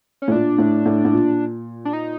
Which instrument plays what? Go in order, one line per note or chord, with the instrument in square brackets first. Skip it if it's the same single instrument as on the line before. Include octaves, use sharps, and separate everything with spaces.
[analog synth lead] C#4
[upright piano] A2
[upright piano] A#2 [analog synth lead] D4
[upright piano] A2
A2
A2
A#2
[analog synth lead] D4
D#4